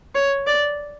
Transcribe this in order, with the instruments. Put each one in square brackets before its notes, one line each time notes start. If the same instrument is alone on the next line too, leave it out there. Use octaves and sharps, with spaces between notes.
[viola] C#5
D5